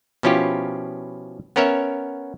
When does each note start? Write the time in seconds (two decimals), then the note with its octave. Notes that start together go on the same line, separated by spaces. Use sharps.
0.23 B2 F3 C#4 E4 F4 G4
1.56 B3 C#4 A#4 C#5 E5